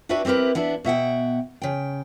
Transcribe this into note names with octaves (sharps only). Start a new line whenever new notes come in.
D4 E4 F#4 G4 B4 E5
C4 E4 G4 A#4 B4
B3 D4 E4 E5
B2 E5 F#5 G5
C#3 G5